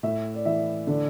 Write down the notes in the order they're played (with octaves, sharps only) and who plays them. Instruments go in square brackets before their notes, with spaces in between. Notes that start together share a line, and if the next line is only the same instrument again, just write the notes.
[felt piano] A2 [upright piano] E5
[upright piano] D5
[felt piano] E3 [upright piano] E5
[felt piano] D3 [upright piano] D5